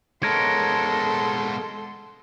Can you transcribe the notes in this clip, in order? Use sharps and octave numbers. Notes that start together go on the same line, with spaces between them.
G#3 B3 A4 A#4 C#5 C6